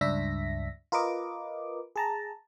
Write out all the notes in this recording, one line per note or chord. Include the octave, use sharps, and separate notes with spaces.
C#2 G2 D4 E5 A#6 B6
F4 A#4 B4 D#5 D6
G#4 A5 A#5